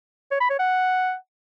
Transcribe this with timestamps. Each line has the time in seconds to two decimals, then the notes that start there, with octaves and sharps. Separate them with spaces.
0.31 C#5
0.41 B5
0.50 C#5
0.59 F#5